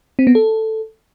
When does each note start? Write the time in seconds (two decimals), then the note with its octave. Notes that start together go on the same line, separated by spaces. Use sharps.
0.19 C4
0.27 B3
0.35 A4